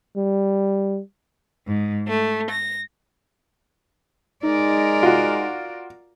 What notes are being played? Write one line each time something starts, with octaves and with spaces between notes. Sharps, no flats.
G3
G#2
A3
A#6
G#3 D#4 A#4 D5
F4 F#4